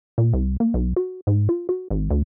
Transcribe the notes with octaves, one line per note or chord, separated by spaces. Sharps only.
A#2
C2
A#3
B1
F#4
G#2
F4
F#4
G#1
D2